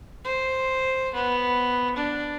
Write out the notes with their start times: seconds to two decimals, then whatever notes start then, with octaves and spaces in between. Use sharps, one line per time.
0.25 C5
1.14 B3
1.96 D4